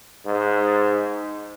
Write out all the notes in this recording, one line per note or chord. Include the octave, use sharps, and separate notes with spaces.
G#2